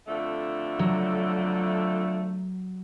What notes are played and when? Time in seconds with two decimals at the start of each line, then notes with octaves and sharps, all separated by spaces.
0.08 F2 D3 A3
0.79 F#3